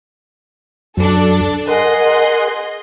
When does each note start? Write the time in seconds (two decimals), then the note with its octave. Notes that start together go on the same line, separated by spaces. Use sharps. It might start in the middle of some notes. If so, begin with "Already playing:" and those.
0.97 F#2 F#3 D4 A4
1.67 G#4 A#4 D#5 F#5 C6